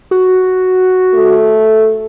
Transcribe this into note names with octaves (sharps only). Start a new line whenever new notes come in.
F#4
A3